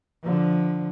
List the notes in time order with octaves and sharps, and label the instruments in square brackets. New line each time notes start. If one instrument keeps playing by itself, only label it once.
[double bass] D3 F3